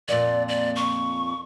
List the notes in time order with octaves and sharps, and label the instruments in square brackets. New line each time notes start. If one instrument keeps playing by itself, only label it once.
[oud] F2 A#2 [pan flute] D5
[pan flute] D5
C#6